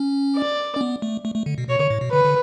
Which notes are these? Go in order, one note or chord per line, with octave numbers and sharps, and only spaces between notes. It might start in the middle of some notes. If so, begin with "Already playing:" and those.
Already playing: C#4
D5
C#4
B3
A3
A3
A3
D3
B2
B2 C#5
D3
A2
B2
D3 B4
D3